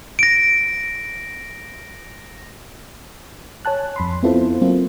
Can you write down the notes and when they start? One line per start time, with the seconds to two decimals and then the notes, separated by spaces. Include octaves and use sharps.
0.19 A#6 D7
3.65 C#5 G#5 A5 F#6
3.96 F2 B5 C6
4.23 B3 C4 E4 F4 A4 C5
4.62 F#3 A#3 C4 F4